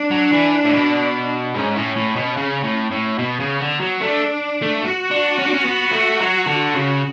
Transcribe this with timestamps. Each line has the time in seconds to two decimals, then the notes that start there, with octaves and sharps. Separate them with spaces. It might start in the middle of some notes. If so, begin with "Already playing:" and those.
Already playing: D4
0.11 F#3
0.32 E3
0.65 A2
0.73 B2
1.55 G#2 C#4
1.76 A2
1.96 A2
2.16 B2
2.37 C#3
2.64 A2
2.91 A2
3.19 B2 B3
3.40 C#3
3.60 D3
3.80 F#3
4.01 A3 D4
4.62 A3
4.83 F#4
5.11 D4
5.38 C#4
5.46 D4
5.54 C#4
5.65 B3
5.92 A3
6.20 F#3
6.47 D3
6.74 C#3